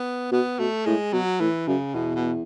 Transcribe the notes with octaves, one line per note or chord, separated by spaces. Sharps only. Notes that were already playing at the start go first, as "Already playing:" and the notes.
Already playing: B3
B2 B3
B2 A3
A2 G#3
B2 F#3
A2 E3
F#2 C#3
E2 B2
B2